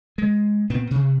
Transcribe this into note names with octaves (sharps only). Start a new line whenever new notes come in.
G#3
A#2 B3 C4
C3